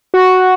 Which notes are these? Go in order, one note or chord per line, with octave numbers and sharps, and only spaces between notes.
F#4